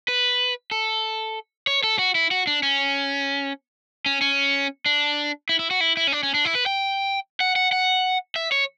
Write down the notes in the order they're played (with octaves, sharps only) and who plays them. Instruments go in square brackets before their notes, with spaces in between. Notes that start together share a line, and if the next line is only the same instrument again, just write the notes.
[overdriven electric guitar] B4
A4
C#5
A4
F#4
E4
F#4
D4
C#4
C#4
C#4
D4
E4
E4
F#4
E4
E4
C#4
D4
C#4
D4
E4
B4
G5
F#5
F#5
F#5
E5
C#5